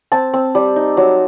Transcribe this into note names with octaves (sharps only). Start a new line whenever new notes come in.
C4 A5
C4
G3
D#4
F#3